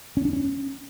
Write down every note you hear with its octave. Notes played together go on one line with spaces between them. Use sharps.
C#4
D4
C#4